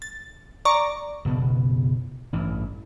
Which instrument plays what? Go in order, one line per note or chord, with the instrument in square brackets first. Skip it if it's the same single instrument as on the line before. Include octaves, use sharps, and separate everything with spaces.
[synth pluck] A6
D5 A#5 C#6
[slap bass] F#1 B2 B3
A1 G2 E3